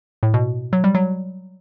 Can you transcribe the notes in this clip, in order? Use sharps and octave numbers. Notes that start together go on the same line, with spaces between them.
A2
B2
F#3
G3
F#3